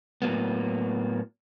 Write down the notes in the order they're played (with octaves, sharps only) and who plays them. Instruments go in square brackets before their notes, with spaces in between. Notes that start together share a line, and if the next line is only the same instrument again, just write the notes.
[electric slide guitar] A2 F#3 A#3 B3